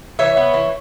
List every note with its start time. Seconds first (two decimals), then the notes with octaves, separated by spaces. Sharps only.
0.19 E3 C#5 E5
0.37 B3
0.54 E3